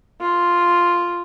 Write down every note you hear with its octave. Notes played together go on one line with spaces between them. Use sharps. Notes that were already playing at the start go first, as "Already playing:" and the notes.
F4